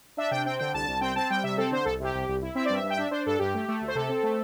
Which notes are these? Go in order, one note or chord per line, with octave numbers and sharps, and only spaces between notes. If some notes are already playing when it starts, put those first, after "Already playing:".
D4 E5
C3 G5
C4 G5
D3 G5
C2 A5
C2
C4 G5
C4 A5
G3 G5
C3 E5
C4 A4
D3 C5
C2 A4
C3 G4
C2
C2
E4
C4 E5
D5
G2 E5
G2
G5
D4 E5
D4 C5
G2 A4
G2 G4
A3
A3
D2
C5
C3 A4
C4
A3